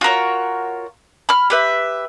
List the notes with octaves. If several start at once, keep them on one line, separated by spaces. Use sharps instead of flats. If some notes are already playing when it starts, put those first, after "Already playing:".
F4 F#4 A#4 C#5
B5 F6
G4 B4 E5